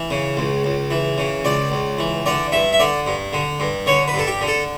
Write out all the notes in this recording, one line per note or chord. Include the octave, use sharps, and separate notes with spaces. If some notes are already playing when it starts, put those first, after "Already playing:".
Already playing: E3
C#3
C#2
C#2
E3
C#3
C#2 D5
C#2
E3
D3 D5
G2 E5
E5
D3 D5
G2
D3
G2
D3 C#5
B4
G2 A4
G4
D3
A4